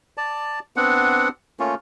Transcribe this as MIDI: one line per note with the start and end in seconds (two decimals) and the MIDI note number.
0.17 0.59 74
0.17 0.59 81
0.76 1.29 59
0.76 1.29 60
0.76 1.29 62
0.76 1.29 78
1.60 1.74 57
1.60 1.74 58
1.60 1.74 61
1.60 1.74 65